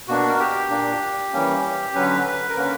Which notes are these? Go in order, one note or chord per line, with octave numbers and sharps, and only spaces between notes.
B2 A#3 D4 F#4
A#4
G4
A#2 A#3 D4
E3 G3 A#3 C#4
D3 F#3 C#4 B4
B4
A#4
D3 A#3 C#4 B4